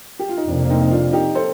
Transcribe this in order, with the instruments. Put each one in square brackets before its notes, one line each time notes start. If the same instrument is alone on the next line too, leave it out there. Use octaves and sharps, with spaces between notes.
[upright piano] G4
F4
D#4
[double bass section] F2 C3 F3 A#3 [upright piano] D4
[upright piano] D4
C4 D#4
D#4
D4 F4
D#4 G4
A4 C5